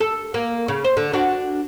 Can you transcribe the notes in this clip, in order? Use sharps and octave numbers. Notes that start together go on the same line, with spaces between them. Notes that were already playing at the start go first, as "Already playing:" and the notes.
A4
A#3
C#3
C5
D3
D4 F#4